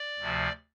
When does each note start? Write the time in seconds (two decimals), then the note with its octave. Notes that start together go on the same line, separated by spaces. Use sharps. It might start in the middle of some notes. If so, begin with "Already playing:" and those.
Already playing: D5
0.19 D2 C3 F3